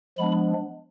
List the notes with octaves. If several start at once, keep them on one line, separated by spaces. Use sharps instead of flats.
F3 G#3 B3 D4 B5